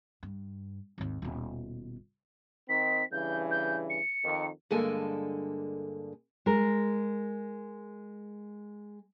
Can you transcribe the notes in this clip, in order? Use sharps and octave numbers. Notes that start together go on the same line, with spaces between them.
G2
G#1 D#2
D#1 B2
D#3 C4 D#4 B6
G2 C#3 E3 G6
G6
C#7
F2 D#3
G2 D3 G#3 A#3 A4 G#5
G#3 A#4